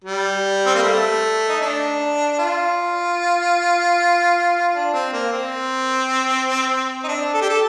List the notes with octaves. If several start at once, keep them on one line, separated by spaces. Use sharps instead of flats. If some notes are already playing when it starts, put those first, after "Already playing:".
G3
C4
A#3
A3
D#4
D4
F4
D4
C4
A#3
C4
D#4
D4
A4
G4
A4